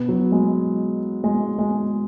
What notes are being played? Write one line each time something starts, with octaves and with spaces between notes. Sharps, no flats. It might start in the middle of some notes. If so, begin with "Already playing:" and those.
Already playing: B2 B3
F#3
G#3
G#3
G#3